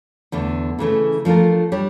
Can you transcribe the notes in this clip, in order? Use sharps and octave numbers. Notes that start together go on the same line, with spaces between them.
E2 D3 A3
C#3 E3 A3 C#4
F3 A3 D4 F4 A#4
G3 D4 G4 C#5